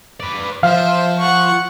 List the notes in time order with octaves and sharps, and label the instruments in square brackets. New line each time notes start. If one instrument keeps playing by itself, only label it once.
[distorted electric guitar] B4 D5
[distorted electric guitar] F3 [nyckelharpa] C5 E5 [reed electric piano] F5
[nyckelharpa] F#5 C#6